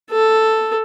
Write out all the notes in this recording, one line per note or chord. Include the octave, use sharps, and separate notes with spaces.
A4